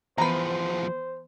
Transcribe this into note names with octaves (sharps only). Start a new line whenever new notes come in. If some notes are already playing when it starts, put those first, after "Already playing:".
E2 E3 F3 B3 B4 C5 A#5